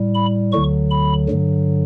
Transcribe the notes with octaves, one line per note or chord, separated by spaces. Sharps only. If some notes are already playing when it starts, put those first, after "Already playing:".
Already playing: A2 G3
B5
D2 D3 F#3 C#6
B5
G2 D3 F#3